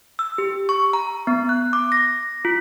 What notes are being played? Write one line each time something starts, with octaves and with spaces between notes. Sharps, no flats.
E6
G4
C#6
A#5
B3
F#6
D6
A#6
F4